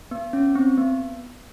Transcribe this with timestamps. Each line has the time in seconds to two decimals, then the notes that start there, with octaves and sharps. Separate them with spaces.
0.11 B3
0.33 C#4
0.55 C4
0.78 B3